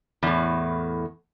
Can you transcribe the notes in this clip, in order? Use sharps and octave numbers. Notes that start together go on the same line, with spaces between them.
E2 A2